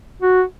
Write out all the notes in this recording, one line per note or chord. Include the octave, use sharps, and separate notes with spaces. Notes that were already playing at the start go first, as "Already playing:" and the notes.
F#4